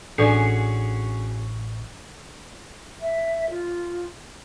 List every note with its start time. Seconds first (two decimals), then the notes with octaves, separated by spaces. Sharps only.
0.18 A1 C#4 D4 F#4 G#4 A4 D5 C#6
3.02 E5
3.50 F4